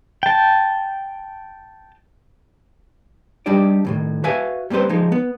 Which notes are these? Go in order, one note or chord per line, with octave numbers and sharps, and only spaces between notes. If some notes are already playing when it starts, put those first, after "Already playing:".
G5 A5
G3 D4 D#4 G4 D5
D2 A2 D#3
F#4 B4 E5 F5 G#5
G3 A#3 C4 B4 C5
F3 G#3 D#4
B3